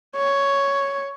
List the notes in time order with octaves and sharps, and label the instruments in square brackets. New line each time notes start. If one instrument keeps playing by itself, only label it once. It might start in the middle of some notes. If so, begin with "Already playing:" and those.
[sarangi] C#5